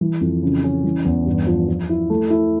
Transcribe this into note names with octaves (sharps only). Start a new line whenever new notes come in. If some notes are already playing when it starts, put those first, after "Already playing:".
E3
F2
C#3
C#4
E3
E2
G2
F3
F3
E4
A3
E4